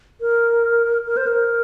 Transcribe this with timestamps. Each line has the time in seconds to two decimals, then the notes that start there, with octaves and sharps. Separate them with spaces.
0.21 A#4
1.07 A#4
1.17 C5
1.27 A#4